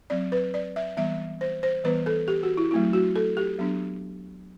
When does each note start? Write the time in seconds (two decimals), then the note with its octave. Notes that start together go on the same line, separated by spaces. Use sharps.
0.10 F#3 C4 D5
0.32 B4
0.54 D5
0.76 E5
0.97 E3 G3 B3 E5
1.41 C5
1.63 C5
1.84 E3 G3 B3 B4
2.06 A4
2.28 G4
2.43 F#4
2.57 E4
2.71 F#3 A3 C4 E4
2.93 F#4
3.16 A4
3.37 G4
3.59 F#3 B3 D4